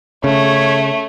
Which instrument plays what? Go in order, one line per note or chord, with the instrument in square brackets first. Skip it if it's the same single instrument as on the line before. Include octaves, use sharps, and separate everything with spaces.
[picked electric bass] C#3 [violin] A3 [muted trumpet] C#5